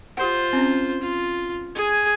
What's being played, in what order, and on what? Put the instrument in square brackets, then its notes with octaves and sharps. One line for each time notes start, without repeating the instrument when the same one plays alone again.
[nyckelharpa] F4 C5 [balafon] G4 F#5
[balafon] C4 C#4
[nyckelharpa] F4
G#4 G#5